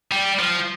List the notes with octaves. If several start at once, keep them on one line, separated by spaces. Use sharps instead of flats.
G3
F3